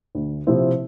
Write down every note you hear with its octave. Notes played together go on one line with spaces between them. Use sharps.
D2
C3 F3 C4 E4